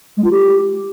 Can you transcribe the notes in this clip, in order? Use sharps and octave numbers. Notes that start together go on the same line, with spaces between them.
G#3
F4
G4